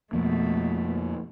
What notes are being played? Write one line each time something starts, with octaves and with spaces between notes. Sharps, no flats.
F2 B2 F3 A3 A#3